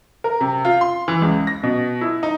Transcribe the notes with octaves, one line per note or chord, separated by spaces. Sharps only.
A#4
C3
F4
C6
E3
C#2
A#6
B2
E4
D#4